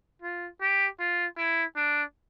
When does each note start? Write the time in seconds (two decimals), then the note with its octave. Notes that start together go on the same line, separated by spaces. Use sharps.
0.22 F4
0.61 G4
0.99 F4
1.37 E4
1.76 D4